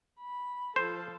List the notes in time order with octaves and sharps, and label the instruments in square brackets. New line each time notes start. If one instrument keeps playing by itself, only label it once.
[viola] B5
[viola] F3 A4 [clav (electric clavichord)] C5